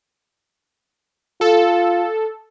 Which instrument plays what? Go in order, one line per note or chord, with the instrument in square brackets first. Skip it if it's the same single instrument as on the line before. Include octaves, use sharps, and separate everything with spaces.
[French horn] F4 [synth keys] A4